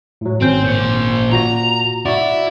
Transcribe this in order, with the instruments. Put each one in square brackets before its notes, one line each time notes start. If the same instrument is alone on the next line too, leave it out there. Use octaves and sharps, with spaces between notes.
[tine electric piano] A2 F#3
[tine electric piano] G#1 C#4 G6 [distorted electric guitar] C4
[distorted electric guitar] A#2 C5
[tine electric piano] A#2 F#4 A#6 [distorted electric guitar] A#5
[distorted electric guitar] E4 [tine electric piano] F#4 D5 E5